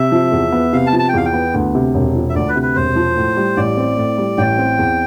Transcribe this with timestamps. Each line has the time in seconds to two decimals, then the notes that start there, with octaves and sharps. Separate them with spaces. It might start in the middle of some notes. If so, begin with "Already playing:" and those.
Already playing: C3 E5
0.12 F3
0.32 E2
0.52 B3
0.73 C3 F5
0.87 A5
0.93 F3
0.99 A5
1.09 G5
1.14 E2 F5
1.25 G5
1.33 B3
1.54 D2
1.75 C3
1.94 E1
2.15 F3
2.30 E5
2.35 D2 D5
2.49 B4
2.55 C3
2.62 B4
2.76 E1 C5
2.96 F3
3.16 A2
3.37 G3
3.57 A1 D5
3.77 C4
3.97 A2
4.18 G3
4.37 A1 G5
4.59 C4
4.79 E2